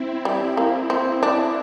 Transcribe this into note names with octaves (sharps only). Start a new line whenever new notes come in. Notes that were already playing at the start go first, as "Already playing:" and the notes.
Already playing: C4 E4
G3
A#3
C4
D4